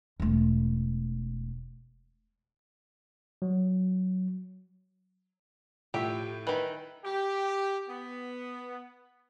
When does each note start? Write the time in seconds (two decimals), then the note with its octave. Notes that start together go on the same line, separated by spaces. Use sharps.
0.20 E1 A3
3.42 F#3
5.94 A2 F3 G4 E5
6.47 D#3 E3 B4
7.04 G4
7.87 B3